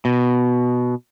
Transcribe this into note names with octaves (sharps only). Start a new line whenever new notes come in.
B2